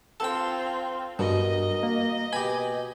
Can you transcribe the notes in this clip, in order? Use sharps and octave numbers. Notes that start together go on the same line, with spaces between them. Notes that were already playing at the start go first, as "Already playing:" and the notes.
C4 F4 A4 G5
G2 B2 A#4 D#5
A#3
B2 G4 G#5 B5